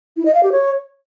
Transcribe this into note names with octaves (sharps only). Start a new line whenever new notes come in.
E4
D#5
F5
G4
C#5